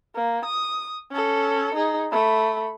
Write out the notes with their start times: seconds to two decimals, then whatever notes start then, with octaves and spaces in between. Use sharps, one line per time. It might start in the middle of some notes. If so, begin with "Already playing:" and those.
0.15 A#3
0.45 D#6
1.12 C#4 A4
1.75 D#4 G#4
2.12 A3 B5